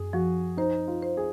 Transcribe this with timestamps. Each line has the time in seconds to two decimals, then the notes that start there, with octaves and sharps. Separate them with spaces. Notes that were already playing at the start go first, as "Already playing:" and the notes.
Already playing: F#2 G#4
0.13 F3 F#4
0.57 D#4 C5
0.88 F4
1.02 C5
1.17 G#4